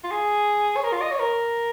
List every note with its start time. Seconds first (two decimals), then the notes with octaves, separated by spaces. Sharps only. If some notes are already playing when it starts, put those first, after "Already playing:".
0.04 F4
0.11 G#4
0.77 C#5
0.84 A#4
0.93 F4
1.02 D#5
1.11 C#5
1.20 A#4